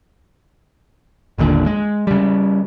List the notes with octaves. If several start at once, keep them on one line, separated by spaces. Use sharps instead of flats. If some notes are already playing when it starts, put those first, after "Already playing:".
G1 D#2 A#2 D3
G#3
C#3 G3